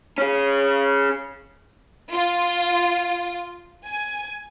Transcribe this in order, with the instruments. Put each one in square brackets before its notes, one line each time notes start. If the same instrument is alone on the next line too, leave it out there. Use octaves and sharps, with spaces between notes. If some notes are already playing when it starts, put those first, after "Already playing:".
[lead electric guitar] C#4 G#4
[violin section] F4
G#5